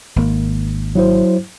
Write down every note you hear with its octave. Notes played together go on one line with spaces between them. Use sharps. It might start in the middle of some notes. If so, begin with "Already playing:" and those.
G#1 A#3
F#3 E4 C5